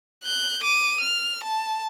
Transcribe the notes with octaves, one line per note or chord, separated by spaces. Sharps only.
F#6 G6
D6 D#7
F6
A5